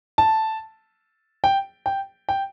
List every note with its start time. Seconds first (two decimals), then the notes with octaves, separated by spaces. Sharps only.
0.18 A5
1.44 G5
1.86 G5
2.29 G5